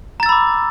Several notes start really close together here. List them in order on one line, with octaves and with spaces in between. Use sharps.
A#5 A6 E6 B5 D6